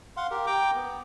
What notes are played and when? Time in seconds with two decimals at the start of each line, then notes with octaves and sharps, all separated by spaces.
0.17 F5 F#5 C6
0.31 G4 A#4
0.47 G5 A#5 D6
0.76 B3